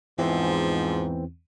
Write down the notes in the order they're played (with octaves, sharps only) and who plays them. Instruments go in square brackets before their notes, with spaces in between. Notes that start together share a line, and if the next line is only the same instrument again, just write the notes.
[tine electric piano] E2 E3 C4 [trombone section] G#2 [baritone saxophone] F3